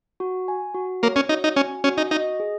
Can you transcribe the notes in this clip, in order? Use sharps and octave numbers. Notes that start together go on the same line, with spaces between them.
F#4
G#5
F#4
A#3 C#5
C#4
D#4 F#4
D#4
C#4 G#5
C#4 F#4
D#4
D#4 D#5
G#4